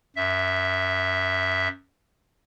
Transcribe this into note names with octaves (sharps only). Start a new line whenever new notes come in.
F#2 E5